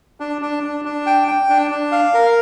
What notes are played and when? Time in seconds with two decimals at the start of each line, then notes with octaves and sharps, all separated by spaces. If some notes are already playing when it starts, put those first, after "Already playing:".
0.20 D4
0.42 D4
0.63 D4
0.85 D4
1.06 G5
1.28 G5
1.49 D4
1.71 D4
1.92 F5
2.14 A#4